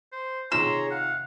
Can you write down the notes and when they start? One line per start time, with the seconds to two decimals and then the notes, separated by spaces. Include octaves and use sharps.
0.13 C5
0.52 C3 D#3 F4 G#4 C#5 A#5 C6 E6
0.91 F5 F#5